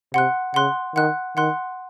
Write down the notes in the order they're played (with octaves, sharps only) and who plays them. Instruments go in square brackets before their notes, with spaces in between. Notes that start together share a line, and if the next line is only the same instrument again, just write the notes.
[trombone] C3 [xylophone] F#5 C6 F#6
[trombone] C#3 [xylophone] F#5 C6 F#6
[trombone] D#3 [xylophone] F#5 C6 F#6
[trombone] D#3 [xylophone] F#5 C6 F#6